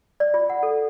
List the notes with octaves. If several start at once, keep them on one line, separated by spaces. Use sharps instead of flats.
D5
F4
F#5
A4